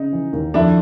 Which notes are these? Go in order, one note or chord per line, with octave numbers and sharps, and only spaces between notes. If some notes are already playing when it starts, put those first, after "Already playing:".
Already playing: C#3 D#4
E3
D#2
F2 D4 E4